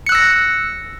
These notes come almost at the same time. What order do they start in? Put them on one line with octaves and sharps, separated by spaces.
C#7 F#6 E6 A#6